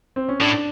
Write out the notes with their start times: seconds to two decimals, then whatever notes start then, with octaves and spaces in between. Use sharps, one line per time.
0.16 C4
0.29 C#4
0.41 A2 D4